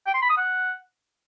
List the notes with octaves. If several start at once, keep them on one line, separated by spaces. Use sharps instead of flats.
G5
C6
B5
D#6
F#5